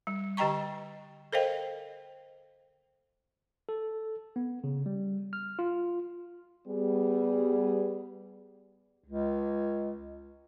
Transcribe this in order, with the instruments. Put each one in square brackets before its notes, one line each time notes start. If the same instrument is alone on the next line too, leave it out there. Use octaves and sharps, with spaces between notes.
[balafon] G3
D3 G4 D#5 G5 A#5 C#6
A4 A#4 C5 D#5 F5 G5
[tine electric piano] A4
B3
C#3
G3
F6
F4
[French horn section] G3 B3 G#4
[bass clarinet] C#2